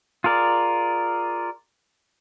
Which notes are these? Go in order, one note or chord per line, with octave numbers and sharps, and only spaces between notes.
F4 G#4 A#4 D5